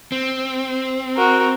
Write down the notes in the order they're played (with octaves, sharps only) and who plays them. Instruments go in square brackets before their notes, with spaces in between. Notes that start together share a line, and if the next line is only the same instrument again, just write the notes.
[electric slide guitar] C4
[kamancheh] F#4 A#4